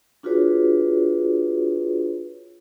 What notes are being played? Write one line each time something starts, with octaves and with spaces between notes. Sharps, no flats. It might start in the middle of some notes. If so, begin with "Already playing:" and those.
D4 F4 F#4 G#4 B4 C#5